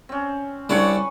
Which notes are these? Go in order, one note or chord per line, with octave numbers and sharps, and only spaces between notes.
C4 C#4
C2 D4 B4 C#5 C#6